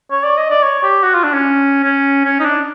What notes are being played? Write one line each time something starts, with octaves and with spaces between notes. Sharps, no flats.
C#5
D5
D#5
D5
C#5
G4
F#4
F4
D4
C#4
C#4
C#4
D#4
D4